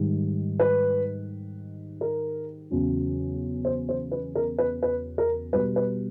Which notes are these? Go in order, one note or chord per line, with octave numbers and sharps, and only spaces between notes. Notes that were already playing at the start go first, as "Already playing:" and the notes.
Already playing: G#2 D#3 G3
B4
A#4
E2 C#3 F#3
C5
C5
B4
A#4
B4
B4
A#4
B2 G3 B4
B4